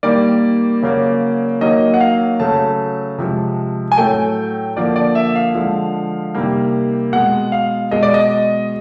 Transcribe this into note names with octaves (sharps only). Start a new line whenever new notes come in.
D#3 G3 A#3 D5
C#3 F#3 A#3
D#3 F#3 A#3 D#5
F#5
F5
C#3 F#3 A3 A5
C3 F3 G#3
G#5
A2 F#3 A3 G5
D3 F3 A#3 D5
D5
E5
F5
D3 F3 G#3
C3 D#3 G3 A#3
B2 G#3 F#5
F5
B2 G#3 D#5
D5
D#5